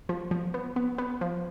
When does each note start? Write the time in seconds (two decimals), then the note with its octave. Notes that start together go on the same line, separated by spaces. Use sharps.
0.09 F3
0.31 F3
0.54 B3
0.76 B3
0.98 B3
1.21 F3